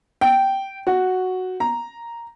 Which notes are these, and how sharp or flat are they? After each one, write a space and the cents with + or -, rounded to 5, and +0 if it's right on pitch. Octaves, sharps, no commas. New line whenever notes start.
G5 -10
F#4 +0
A#5 +0